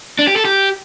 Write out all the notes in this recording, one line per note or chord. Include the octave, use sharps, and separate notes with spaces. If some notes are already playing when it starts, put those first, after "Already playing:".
D4
G4
A4
G4